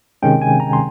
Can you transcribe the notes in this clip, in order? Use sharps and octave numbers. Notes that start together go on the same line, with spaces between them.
C3 D#3 G#3 C#4 G5
G#5
A#5
C6